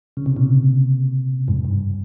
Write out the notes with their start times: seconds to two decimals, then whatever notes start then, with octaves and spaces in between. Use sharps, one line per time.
0.17 C#3
0.26 C3
0.36 A#2 C#3
1.48 F2 G#2
1.65 G2